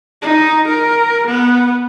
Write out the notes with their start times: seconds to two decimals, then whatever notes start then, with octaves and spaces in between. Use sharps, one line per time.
0.23 D#4
0.68 A#4
1.27 B3